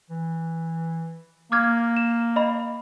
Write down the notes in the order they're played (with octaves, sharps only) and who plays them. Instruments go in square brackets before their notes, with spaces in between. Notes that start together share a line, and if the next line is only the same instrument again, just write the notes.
[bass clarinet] E3
[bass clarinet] A#3 [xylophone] D6 F6 G#6
[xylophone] E7
D#5 B5